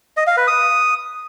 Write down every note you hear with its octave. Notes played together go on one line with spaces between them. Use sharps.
D#5
F5
B4
D#6